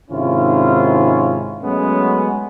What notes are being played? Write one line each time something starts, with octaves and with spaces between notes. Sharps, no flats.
G#2 C3 D#3 C#4 E4 F4
F#3 G#3 A3 B3 C#4